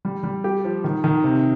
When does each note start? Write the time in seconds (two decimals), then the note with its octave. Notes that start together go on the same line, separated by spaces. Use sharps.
0.05 G3
0.24 G3
0.44 G4
0.65 F3
0.84 D#3
1.04 D#3
1.24 C3